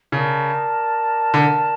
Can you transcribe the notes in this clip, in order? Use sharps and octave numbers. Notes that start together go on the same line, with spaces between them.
C#3 A#4 D5 A5
D3